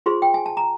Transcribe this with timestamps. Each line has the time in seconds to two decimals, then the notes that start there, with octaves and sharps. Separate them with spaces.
0.06 F4 G#4 C5 C6
0.22 G5
0.34 G#5
0.46 A5
0.57 A#5